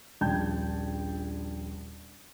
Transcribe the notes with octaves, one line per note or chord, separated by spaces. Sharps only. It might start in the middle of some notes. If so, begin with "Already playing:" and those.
D#1 A#1 G5 A5 G6 G#6